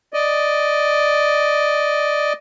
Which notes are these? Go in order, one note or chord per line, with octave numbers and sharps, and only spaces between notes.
D5 D#5